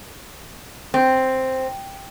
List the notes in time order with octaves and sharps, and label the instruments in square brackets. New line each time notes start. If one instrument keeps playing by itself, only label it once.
[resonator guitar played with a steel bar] C4